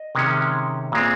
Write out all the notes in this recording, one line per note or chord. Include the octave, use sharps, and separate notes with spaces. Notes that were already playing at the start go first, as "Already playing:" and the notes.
Already playing: D#5
C3 D#3 G#3 C#4
A#2 G#3 C4